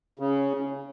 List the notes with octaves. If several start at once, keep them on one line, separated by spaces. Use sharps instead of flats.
C#3